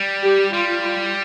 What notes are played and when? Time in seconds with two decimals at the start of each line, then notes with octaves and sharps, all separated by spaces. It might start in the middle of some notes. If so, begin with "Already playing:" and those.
Already playing: G3
0.23 G4
0.53 G3 F4